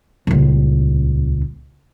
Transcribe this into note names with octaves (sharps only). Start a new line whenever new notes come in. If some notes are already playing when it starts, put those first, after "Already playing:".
D#1 C#2